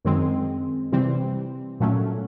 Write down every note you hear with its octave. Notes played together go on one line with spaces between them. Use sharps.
F#2 D#3 G#3 C4
C3 E3 G3 C4
A#2 F#3 A3 C#4